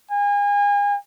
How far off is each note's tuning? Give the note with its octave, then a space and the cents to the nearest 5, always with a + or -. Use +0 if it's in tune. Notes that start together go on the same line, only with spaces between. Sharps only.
G#5 -35